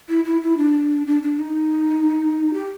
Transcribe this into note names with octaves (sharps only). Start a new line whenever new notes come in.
E4
E4
E4
D4
D4
D4
D#4
G4